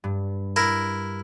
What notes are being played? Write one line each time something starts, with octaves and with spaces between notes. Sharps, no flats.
G2
E4 A#4